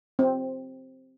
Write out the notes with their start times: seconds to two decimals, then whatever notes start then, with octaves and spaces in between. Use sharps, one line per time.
0.19 C4